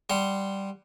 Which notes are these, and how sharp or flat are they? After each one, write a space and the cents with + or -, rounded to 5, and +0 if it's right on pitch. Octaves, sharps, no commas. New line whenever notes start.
G3 +0 F#5 +0 C6 +0